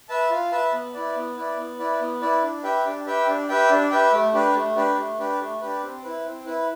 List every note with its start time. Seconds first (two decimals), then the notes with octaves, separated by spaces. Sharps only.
0.09 B4 E5 A5
0.30 F4
0.51 B4 E5 A5
0.73 B3
0.94 E4 B4 D5
1.15 B3
1.36 E4 B4 D5
1.57 B3
1.79 E4 B4 D5
2.00 B3
2.21 E4 B4 D5
2.42 D4
2.63 G4 B4 E5 G5
2.85 D4
3.06 G4 B4 E5 G5
3.27 D4
3.49 G4 B4 E5 G5
3.70 D4
3.91 G4 B4 E5 G5
4.12 A3
4.34 D4 G4 B4
4.55 A3
4.76 D4 G4 B4
4.97 A3
5.18 D4 G4 B4
5.39 A3
5.61 D4 G4 B4
5.82 C4
6.03 E4 B4
6.24 C4
6.45 E4 B4